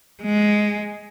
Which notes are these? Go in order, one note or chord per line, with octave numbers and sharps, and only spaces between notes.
G#3